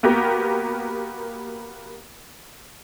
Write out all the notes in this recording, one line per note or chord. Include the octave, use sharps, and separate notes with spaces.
A#3 B3 F#4 G4 A#4